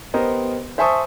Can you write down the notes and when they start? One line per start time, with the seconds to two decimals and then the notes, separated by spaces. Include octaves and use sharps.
0.14 B3 G4 A#4 C5 D#5
0.78 C5 E5 G#5 A5 C#6 D#6